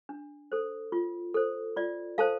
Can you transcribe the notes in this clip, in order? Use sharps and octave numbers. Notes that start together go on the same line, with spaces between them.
D4
A4 C5
F4
A4 C5
F4 D5
A4 C5 F5 A5